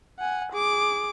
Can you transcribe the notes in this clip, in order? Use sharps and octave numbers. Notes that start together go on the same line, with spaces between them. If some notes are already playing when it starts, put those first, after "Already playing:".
F#5 G#5
G#4 D6